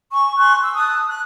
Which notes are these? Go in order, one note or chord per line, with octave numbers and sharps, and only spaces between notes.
G#5 C#6
G#5 C6 C#6 F#6
E6
A5 D#6 F#6
F#6